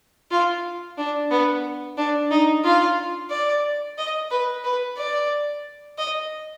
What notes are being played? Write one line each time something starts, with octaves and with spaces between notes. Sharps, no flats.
F4
D4
B3
D4
D#4
F4
D5
D#5
B4
B4
D5
D#5